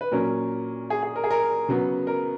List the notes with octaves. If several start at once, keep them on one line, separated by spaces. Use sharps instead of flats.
B4
A#2 F#3 C#4 A#4
G#4
G#4
A#4
G#4
A#4
C#3 F#3 B3
A#4